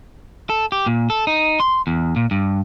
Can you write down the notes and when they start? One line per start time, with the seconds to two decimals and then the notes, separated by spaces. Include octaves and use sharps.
0.50 A4
0.72 G4
0.86 A#2
1.10 A4
1.27 D#4
1.60 C6
1.87 E2
2.16 A#2
2.31 G2